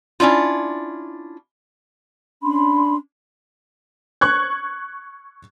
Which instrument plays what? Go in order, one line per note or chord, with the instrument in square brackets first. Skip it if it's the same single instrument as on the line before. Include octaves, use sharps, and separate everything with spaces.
[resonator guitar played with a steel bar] C#4 D4 E4 F4
[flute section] C#4 D4 B5 C6
[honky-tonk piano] C#6 F#6 G#6